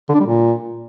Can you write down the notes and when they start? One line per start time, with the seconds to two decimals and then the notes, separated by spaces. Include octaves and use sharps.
0.09 D3
0.15 D4
0.20 G3
0.26 A#2